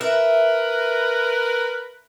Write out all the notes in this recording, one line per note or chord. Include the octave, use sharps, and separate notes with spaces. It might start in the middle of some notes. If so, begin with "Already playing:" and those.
A#4 B4 E5